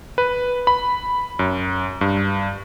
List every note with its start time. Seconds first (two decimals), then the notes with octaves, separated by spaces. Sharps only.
0.18 B4
0.67 B5
1.39 F#2
2.01 G2